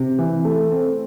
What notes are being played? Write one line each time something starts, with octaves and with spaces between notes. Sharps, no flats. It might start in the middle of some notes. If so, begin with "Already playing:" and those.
Already playing: C3
E3
A3
C4